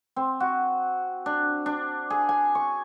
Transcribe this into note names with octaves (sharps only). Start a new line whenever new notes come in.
C4
F#4
D4
D4
G#4
G#5
C#6